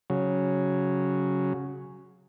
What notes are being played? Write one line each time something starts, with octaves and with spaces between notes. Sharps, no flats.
C#3 F#3